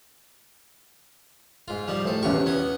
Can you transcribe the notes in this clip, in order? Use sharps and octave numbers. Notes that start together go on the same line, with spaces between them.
G#2 F4
F3 G3 D#4
A2 A4 C5
E2 B2 C#4 F4 G4 C#6
B3 G#5 D#6